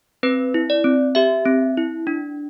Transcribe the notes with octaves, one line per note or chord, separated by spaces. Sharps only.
C4 B4
E4
D5
C4
G4 E5
C4
E4
D4